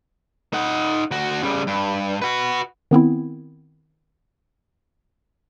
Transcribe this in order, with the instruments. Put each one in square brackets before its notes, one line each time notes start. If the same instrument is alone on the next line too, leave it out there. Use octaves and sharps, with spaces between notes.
[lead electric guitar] D#4 F#5
D2 F#4
C#3 G3
G2
F#4 B4
[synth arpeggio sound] D#3 B3 C4 E4